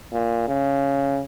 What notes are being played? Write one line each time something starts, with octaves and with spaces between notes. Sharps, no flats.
A#2
C#3